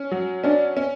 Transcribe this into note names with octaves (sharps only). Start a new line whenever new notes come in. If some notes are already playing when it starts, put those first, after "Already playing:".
Already playing: C#4
F#3
C#4 D4
C#4